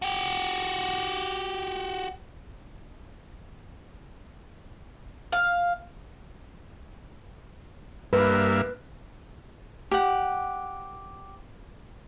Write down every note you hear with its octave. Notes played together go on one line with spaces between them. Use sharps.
F#4 G4
F5
G2 A#3 B4 E5
G4 F#5